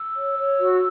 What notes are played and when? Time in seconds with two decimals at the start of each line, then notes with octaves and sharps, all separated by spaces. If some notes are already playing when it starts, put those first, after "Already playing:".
Already playing: E6
0.15 C#5
0.38 C#5
0.60 F#4